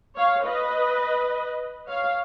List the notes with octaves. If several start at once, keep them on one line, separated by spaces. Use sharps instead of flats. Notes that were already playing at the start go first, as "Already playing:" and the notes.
C#5 F5
B4 D#5
C#5 F5